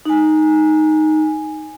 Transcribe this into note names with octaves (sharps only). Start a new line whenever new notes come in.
D#4 G#5